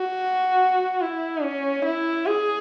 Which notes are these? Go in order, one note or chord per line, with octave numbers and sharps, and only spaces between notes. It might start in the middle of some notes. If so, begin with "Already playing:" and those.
Already playing: F#4
E4
C#4
E4
G#4